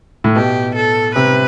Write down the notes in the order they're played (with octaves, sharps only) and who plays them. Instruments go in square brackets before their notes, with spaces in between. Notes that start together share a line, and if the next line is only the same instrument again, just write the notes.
[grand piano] A2
[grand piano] B2 [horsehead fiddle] G4
[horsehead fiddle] A4
[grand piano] C3 [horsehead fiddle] B4